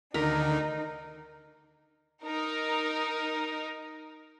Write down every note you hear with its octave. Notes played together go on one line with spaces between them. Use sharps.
D2 D3 D#3 D#4 A#4
D#4 A#4